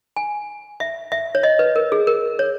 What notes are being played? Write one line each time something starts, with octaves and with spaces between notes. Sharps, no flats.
G#5
E5
E5
C#5
D#5
B4
A#4
G#4
A#4
C#5